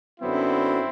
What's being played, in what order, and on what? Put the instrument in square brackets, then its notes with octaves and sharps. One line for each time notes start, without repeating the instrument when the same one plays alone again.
[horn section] F#2 D3 F#3 B3 C4 E4